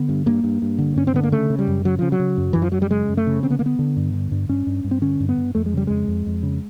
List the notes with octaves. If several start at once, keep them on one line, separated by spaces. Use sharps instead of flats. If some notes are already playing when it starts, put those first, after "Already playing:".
Already playing: D3 B3
G2
G2 A#3
G2
G2
D3
G2 C#4
C4
D3 B3
A#3
C#3 A3
C#3
G3
F#2
C#3 F#3
C#3 F3
F#3
C#3
F#2
F#2 E3
F3
F#2 F#3
G3
C#3 G#3
F#2
A3
C#3
D3 C4
B3
D3 A#3
B3
D3
G2
D3
G2
G2 C#4
G2
G2
C4
D3 C#4
G2
B3
G2
F2 A3
G#3
C#3 G3
F2 G#3
F2
F2
C#3